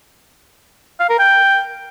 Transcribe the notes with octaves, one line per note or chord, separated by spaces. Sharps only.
F5
A#4
G5